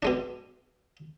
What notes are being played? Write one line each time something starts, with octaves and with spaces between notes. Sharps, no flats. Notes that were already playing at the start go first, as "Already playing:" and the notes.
B2 G#3 D4